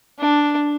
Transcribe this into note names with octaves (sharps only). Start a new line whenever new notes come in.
D4